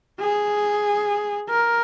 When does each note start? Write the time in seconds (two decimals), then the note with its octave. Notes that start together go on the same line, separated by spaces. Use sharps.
0.20 G#4
1.49 A#4